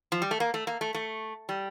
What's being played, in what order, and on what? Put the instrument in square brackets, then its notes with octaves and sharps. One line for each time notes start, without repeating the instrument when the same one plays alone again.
[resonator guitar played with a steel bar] F3
G3
A3
A#3
A3
A#3
A3
A3
G3